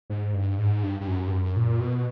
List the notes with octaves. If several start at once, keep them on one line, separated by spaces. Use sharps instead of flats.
G#2
G2
G#2
G2
G2
F#2
G2
F#2
A#2
B2